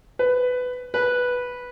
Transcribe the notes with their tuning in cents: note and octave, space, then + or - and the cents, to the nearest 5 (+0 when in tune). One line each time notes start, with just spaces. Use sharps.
B4 +15
B4 -5